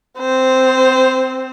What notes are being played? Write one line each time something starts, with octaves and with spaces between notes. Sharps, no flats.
C4 C5